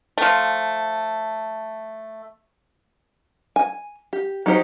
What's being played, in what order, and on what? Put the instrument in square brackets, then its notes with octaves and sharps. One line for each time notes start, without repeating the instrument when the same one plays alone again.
[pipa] F3 A3
[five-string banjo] G#5
G4
F#3 D#4 G4 C5